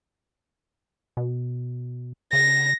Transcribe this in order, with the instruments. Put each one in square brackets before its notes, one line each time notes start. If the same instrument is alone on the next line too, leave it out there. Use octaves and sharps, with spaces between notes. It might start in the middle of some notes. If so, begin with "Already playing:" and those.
[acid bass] B2
[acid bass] C#3 [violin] A#6